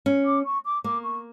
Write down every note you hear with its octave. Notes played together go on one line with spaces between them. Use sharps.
C#4
D6
C#6
D6
A#3 D6
C#6